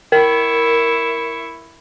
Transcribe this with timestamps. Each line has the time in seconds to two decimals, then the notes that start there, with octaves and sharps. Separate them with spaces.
0.12 E4 A#4 C#6